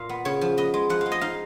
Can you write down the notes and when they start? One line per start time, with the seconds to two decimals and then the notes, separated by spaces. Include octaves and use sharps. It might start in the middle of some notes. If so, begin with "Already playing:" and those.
Already playing: A#2 F5
0.09 B3
0.25 C#3 C#5
0.41 F3
0.57 B3 D#5
0.74 G#3
0.89 F3 F#5
1.01 G#3 F5
1.12 D#5
1.21 D#4 F5